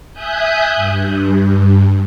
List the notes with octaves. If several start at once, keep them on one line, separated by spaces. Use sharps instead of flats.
E5 G#5 D#6 F#6 G6
G2